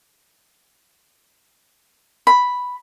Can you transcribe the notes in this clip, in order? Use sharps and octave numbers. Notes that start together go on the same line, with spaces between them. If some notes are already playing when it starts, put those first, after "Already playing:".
B5